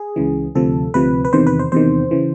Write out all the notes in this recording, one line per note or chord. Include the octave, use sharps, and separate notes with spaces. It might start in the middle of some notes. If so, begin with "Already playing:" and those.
Already playing: G#4
C#2 C#3 E3
D2 C3 F3 A4
D2 C3 F3 B4
B4
E2 C3 D#3 C5
B4
C5
E2 C3 D#3 C5
C#3 E3